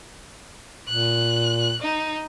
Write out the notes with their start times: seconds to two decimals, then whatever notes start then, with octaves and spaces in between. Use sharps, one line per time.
0.88 A#2 F#6
1.82 D#4